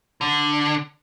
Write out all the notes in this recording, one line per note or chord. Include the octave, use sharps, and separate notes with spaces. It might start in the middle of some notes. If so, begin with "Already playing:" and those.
D3